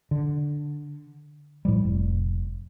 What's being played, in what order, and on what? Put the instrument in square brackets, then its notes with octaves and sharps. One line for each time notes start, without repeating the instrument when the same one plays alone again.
[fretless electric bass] D3
A2 F3 G3
F1